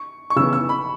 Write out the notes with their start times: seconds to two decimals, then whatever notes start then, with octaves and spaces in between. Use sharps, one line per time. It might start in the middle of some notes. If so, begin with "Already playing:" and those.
Already playing: C#6
0.30 C#6
0.36 C#3 E3 B3 E6
0.53 E6
0.69 B5